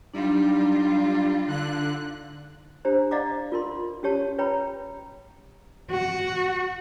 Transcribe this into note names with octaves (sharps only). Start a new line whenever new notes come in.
F#3 G3 D4 D#4 F4
D3 F#6
D4 G4 C5 A#5
D5 D#5 F5 F#5 A#5 D6
F4 A#4 C6
C#4 F#4 G4 C#5 A5
B4 C#5 G5 A#5 B5
F#4